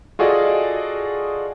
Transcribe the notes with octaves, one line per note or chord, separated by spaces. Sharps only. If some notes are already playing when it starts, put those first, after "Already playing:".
F4 F#4 G#4 A4 D5 D#5